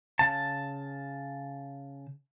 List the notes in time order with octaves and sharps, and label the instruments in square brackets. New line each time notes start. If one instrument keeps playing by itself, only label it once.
[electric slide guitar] C#3 A5